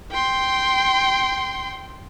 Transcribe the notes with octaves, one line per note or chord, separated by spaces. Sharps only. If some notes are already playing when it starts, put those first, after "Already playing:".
G5 C6